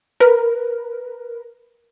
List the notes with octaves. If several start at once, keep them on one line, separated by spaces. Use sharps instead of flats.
A#4 B4